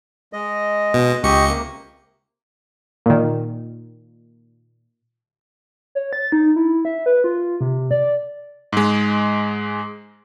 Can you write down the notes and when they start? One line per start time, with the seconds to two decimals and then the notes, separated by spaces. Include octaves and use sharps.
0.33 G#3 D#5
0.94 B2
1.23 C#2 G4 D#5 C#6 C#7
1.49 C3 A#3
3.06 A#2 D#3
5.95 C#5
6.13 A6
6.32 D#4
6.56 E4
6.85 E5
7.06 B4
7.24 F4
7.61 C3
7.91 D5
8.72 G#2 G#3